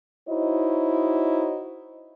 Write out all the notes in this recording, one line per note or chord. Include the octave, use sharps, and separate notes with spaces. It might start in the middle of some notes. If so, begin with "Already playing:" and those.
D#4 E4 F#4 C5 C#5 D#5